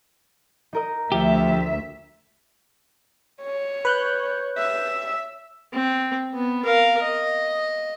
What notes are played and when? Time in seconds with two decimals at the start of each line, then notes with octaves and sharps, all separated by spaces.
0.73 D#4 A#4 D#5
1.12 D2 F3 G4 E5
3.42 C#5
3.85 B4 F#6 G6
4.58 E5
5.73 C4
6.34 B3
6.65 A#4 F5
7.03 D#5